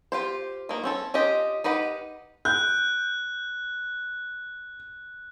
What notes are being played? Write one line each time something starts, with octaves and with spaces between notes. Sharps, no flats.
F4 G4 C5
D#3 A#3
C4 C#4 A4
C#4 F4 G4 D#5
D#4 G4 B4 F#5
F#6 G6